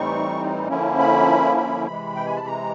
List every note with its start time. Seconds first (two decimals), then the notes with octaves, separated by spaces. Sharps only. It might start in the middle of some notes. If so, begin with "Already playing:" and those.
Already playing: A2 E3 G3 C4 D#4 C#6
0.69 D3 F3 A#3 C#4 E4
0.99 B5
1.57 B5
1.87 C3 E3 G#3 B5
2.15 G5
2.26 G#5
2.36 A5
2.47 A#5